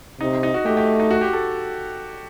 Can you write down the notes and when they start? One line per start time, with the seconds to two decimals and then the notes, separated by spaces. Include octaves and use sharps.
0.20 C3 D#4
0.43 D#4
0.54 F#4
0.66 A3 G4
0.77 G4
1.00 D#4
1.11 F#4
1.21 G4
1.33 A4